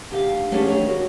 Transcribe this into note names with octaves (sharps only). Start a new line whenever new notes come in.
D2 G4 F5
F#3 A3 C#4 D4 G4 G#4
D#3 G#4 C#5
F#4